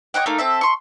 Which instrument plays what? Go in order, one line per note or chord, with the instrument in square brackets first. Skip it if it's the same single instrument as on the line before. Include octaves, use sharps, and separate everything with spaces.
[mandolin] C#5 D#5 F#5 G5
A3 A#3 D#4 F5
C4 A4 E5
C6 C#6